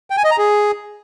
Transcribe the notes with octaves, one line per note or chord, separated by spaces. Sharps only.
G5
G#5
D#5
A#5
G#4